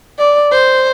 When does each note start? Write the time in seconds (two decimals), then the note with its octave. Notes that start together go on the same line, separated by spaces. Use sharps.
0.19 D5
0.51 C5